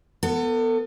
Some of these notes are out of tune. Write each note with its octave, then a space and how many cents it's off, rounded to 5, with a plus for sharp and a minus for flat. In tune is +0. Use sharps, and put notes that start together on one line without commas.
B3 +0 A4 +35